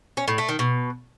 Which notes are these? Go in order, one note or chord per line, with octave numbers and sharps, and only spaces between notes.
C#4
A2
A3
D#3
B2